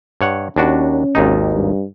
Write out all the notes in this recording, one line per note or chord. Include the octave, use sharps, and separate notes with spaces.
G2 C#5 F#5
D#2 C#4 D4 F#4
G#1 D#2 D#4
G2